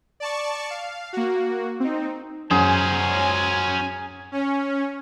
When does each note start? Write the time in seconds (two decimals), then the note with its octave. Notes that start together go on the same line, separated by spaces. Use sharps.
0.20 D5 A5 C#6
0.70 F5
1.13 A#3 F#4
1.80 C4 D#4
2.51 F#2 C#4 G#4 C5 G#5
4.32 C#4